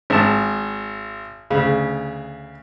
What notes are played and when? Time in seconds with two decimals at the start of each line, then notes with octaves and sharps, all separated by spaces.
0.10 G#1 A5
1.50 D2 C#3